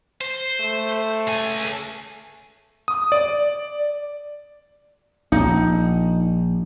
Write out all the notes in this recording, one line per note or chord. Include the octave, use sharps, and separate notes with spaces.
C5
A3
C#2 G#5
D#6
D5
A#1 D#4